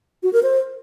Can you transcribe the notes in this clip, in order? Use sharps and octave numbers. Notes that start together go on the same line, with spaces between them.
F#4
A#4
C5